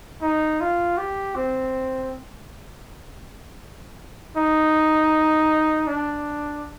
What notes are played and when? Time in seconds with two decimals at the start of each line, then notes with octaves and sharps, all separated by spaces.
0.22 D#4
0.61 F4
0.97 G4
1.35 C4
4.36 D#4
5.87 D4